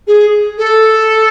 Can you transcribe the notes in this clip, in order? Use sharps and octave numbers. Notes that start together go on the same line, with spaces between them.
G#4
A4